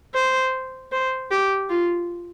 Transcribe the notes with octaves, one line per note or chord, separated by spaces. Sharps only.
C5
C5
G4
F4